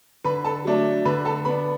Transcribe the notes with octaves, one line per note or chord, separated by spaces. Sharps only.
D3 B4 B5
A4 A5
F#3 A3 D4
D3 B4 B5
A4 A5
B3 D4 B4 B5